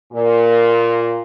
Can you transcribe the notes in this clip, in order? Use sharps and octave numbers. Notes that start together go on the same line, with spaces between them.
A#2